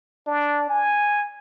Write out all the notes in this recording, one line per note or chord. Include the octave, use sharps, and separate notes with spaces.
D4
G#5